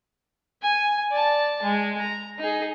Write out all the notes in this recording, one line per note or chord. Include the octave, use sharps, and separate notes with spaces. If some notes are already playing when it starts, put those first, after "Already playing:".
G#5
D5 A5
G#3
A#5
D#4 G#4